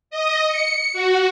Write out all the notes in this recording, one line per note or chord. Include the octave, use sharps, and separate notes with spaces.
D#5
C#7
F#4